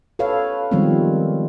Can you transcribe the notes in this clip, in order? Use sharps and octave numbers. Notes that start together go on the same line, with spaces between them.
A4 B4 C#5 F5
D#3 F3 G3 G#3 B3 C4